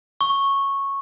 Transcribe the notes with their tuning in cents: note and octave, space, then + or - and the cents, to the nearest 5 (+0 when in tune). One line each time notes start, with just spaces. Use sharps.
C#6 -10